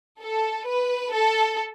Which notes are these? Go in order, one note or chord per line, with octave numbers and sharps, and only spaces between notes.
A4
B4
A4